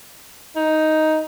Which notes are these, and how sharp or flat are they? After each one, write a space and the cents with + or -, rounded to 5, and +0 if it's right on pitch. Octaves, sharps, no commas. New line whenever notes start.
D#4 +5